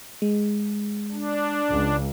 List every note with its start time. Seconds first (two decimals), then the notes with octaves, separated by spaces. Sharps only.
0.22 G#3
1.12 D4
1.69 C#2